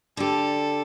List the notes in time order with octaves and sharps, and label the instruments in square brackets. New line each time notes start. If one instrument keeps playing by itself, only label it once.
[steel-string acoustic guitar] D3 G4 [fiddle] A4